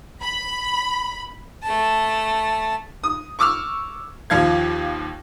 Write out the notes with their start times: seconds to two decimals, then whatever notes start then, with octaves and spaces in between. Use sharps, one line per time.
0.21 B5
1.63 A3 A5
3.04 D#6
3.39 C#6 D6 E6 F6
4.30 D#2 F3 F5 G#6